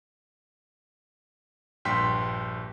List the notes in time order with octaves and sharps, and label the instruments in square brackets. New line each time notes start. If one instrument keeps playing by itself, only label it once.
[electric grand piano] A#1 G2 G5 C6 B6